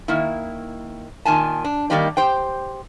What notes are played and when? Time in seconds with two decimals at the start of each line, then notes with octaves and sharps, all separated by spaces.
0.08 D#3 A#3 E4
1.25 A#2 D#3 G#5 A5
1.64 D4
1.90 D#3 G3 A#3 D#4 G4 D5
2.17 G4 C5 G5